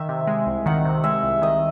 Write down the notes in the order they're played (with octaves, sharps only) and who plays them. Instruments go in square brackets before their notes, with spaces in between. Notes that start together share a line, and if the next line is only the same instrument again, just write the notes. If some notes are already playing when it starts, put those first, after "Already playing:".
Already playing: [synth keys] D#3 [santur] E5
[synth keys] C3
G#3
C2
[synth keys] D#3 [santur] F#5
[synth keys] C3
[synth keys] G#3 [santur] E5
[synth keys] C2
[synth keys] D#3 [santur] D#5